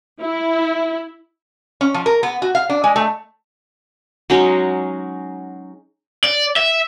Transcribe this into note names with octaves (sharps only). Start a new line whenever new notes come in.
E4
C#4
F3
A#4
B3
F#4
F5
D4
G#3
A3
F#3 G#3 C#4 D#4
D5
E5